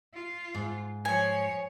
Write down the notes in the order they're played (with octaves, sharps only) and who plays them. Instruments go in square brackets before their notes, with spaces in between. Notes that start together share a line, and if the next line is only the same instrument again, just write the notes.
[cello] F4
[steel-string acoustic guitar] G#2
[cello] F3 C#5 [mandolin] G#5